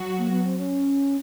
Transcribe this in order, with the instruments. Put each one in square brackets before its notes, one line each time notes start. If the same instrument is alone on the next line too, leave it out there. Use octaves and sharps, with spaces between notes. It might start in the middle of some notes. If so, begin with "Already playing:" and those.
Already playing: [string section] F#3 F#4
[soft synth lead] A#3
B3
C4
C#4